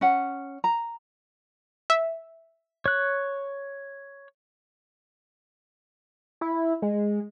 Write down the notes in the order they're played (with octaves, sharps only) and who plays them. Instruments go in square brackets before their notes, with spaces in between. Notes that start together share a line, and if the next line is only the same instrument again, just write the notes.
[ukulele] C#4 F#5
A#5
[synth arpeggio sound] E5
[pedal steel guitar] C#5 F#6
[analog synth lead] E4
G#3